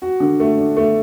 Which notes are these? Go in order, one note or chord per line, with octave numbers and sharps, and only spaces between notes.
F#4
D3
A3
D4
A3